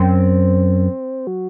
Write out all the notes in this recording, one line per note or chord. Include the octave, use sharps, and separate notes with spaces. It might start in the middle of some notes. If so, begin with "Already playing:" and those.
Already playing: F#2 C4
F#3